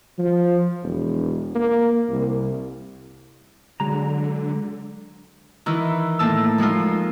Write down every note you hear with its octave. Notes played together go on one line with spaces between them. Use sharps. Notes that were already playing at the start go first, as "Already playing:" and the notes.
F3
E1
A#3
C2
D3 F#3 G#3 A#5
D#3 E3 E4
A2 A#3 A5 E6
F3 G#3 D#4 F4